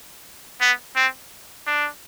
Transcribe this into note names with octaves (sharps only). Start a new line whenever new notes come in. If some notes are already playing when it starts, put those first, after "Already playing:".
B3
C4
D4